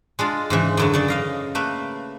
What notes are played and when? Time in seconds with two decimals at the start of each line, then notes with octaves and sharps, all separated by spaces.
0.19 G#3 D4 F4
0.50 G#2 C#3 E3
0.77 F#2 D3 F#3
0.94 C#3 D5
1.08 D#5 F5 A#5
1.55 A3 A#3 B4